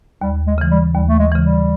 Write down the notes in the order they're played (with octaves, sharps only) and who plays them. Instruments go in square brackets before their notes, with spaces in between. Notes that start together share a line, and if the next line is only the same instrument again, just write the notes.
[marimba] D#2 [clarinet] G3
[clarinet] G#3
[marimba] C#3 E3
[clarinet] G3
[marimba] D#2 [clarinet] G3
[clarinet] A3
G#3
[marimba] C#3 E3
[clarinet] G3